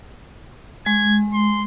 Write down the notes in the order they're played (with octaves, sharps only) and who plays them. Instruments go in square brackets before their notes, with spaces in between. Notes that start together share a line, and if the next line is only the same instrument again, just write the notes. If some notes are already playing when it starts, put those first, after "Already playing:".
[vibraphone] G#3 [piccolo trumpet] G#6
[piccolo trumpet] C6